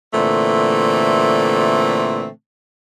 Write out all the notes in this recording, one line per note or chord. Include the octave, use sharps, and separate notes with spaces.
A#2 D3 E3 A3 C4